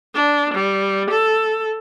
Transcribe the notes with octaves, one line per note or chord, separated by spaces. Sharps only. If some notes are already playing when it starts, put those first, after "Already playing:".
D4
G3
A4